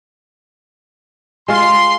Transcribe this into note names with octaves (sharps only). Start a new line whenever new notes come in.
G#3 F4 C6